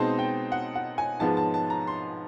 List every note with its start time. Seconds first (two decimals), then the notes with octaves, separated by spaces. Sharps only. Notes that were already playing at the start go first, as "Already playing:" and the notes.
Already playing: B2 G#3 C4 D#4 A5
0.19 G5
0.52 F#5
0.75 F#5
0.98 G#5
1.20 G#2 F3 G#3 B3 A5
1.37 A5
1.54 A5
1.70 A#5
1.87 C6